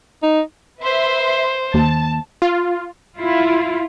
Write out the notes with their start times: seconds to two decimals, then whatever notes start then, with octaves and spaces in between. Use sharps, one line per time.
0.23 D#4
0.82 B4 C5 E5 C6
1.74 D#2 A5
2.42 F4
3.19 E4 F4